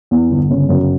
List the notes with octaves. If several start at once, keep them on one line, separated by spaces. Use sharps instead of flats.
E2
G1
C#3
F#2